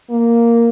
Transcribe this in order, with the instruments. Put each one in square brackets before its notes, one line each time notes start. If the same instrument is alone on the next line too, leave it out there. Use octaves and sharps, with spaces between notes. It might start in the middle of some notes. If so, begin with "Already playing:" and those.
[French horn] A#3